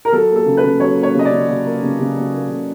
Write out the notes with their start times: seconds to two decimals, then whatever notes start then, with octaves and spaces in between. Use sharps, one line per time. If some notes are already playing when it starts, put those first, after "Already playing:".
0.05 A#4
0.12 F#3 A4
0.30 A#3
0.36 A4
0.46 C#3
0.57 B4
0.64 C#3
0.80 F#3 C#5
0.97 A#3
1.03 C#5
1.15 C#3 D#5
1.25 D5
1.31 C#3
1.49 F#3
1.65 A#3
1.82 C#3
1.99 C#3
2.17 F#3
2.34 A#3
2.50 C#3